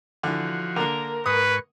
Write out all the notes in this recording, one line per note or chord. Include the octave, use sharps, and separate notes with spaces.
D3 E3 F3 F#4
D3 A#3 A#4
G#2 B4 C#6 D#6